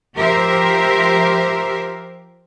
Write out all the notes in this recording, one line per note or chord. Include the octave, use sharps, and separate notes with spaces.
F3 G4 A#4 C5 E5